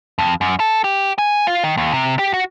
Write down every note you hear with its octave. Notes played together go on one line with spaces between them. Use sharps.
F2
F#2
A4
G4
G#5
F4
D#3
D#2
C3
G4
F#4